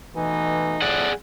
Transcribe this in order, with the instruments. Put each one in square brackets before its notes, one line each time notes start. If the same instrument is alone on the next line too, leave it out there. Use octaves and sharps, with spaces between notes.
[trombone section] B2 A3 D#4 [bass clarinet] E3
[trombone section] F2 A2 [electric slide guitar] G#4 D5 F#5